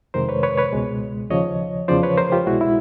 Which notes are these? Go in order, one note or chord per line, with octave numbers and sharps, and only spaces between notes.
F2 C3 D#3 G#3 A#4 C5
B4 C#5
B4 C#5
B4 C#5
C#2 B2 G#3
D#2 C#3 F3 C#5 D#5
E2 C#3 F3 C5 D5
B4 C#5
A#4 C5
F4 G4
C2 B2 G#3 E4 F#4
E4